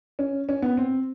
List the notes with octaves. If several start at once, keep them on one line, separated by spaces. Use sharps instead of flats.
C#4
C#4
B3
C4